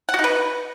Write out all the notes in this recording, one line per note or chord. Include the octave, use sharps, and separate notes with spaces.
F#5
F#4
D#4
B4